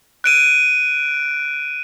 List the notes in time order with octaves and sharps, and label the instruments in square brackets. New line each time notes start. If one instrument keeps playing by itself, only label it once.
[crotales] F#6 D7 D#7